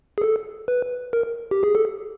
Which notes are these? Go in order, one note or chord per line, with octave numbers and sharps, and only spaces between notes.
G#4
A4
B4
A#4
G4
G#4
A4